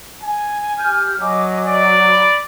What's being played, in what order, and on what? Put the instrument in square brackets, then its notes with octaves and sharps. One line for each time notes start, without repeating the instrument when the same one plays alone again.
[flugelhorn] G#5
[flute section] G4 F6 G6
[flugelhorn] F#3 [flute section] D#5 G#5 D6
[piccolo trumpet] D5
[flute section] B5